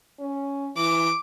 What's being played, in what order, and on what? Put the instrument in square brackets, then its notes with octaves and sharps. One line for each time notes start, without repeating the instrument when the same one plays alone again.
[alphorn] C#4
[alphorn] E3 [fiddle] D6